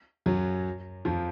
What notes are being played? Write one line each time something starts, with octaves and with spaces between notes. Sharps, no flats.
F#2 F#3
F2 F3